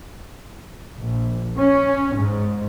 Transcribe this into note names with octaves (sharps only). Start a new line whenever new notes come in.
A#1
C#4
G#2